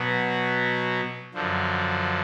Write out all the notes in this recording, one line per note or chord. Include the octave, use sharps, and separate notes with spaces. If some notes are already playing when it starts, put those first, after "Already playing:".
Already playing: B2 F#3 B3
F#2 D3 F3